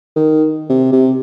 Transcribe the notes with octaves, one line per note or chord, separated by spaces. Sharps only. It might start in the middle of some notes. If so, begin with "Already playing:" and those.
D#3
C3
C3